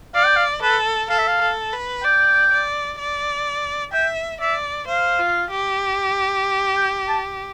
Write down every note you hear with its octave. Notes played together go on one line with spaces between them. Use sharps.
D5 F5
G5
F5
A4 B4
A4 F5
E5
F5
A4
B4
D5 G5
D5
D5
E5 G5
D5 E5
C5 F5
F4
G4
G5
A5